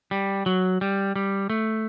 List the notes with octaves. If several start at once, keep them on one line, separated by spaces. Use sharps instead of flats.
G3
F#3
G3
G3
A3